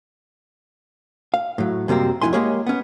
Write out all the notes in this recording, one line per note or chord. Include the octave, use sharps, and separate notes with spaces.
F5
A2 F#3
F#2 C3 G3 A#3 C4
F2 G#3 E4 G#5 C6
G#3 A#3 G4 G#4 C#5
B3 C#4